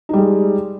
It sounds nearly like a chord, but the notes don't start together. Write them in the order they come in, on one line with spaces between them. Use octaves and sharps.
D#4 G3 G#3